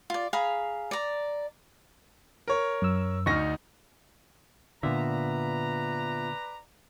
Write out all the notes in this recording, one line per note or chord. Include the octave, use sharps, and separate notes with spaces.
F4 D5
G#4 F5 A#5 B5
D5 A#5
A#4 C#5
F#2 E6
D2 D#4 C#6 F6 A#6
A#2 D3 B3 F4 B4 D5 E5 A#5